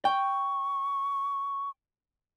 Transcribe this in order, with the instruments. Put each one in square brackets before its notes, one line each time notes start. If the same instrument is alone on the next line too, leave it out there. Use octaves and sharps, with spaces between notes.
[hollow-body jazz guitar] G5 [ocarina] C#6